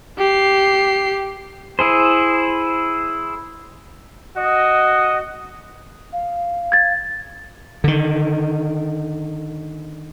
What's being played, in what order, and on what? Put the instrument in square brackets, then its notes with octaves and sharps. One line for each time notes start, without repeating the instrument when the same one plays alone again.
[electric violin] G4 C7
[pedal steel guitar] E4 G#4 C5
[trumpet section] F#4 D#5
[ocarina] F5
[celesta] G#6 A6
[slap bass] D3 D#3